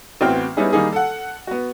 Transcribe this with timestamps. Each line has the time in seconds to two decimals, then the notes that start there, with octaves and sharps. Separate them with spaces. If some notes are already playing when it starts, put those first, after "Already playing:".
0.21 A1 B3 C4 F#4 G5 F6
0.57 G3 B3 C#4 D#4 E4 G#4
0.73 D#3 G3 A#3 D#4 G#4
0.93 A4 F#5
1.47 B3 F#4